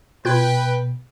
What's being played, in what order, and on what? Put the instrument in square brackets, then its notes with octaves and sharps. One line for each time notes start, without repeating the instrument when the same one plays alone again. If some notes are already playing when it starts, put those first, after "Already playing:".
[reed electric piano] B2 [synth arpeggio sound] F4 F#6 G#6 [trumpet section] B4 G5